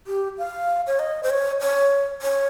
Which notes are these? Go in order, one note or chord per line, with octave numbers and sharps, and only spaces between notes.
G4
F5
C#5
D#5
C5
C#5
C#5
C#5